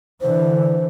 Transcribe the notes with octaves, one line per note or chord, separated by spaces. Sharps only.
D3 E3 C5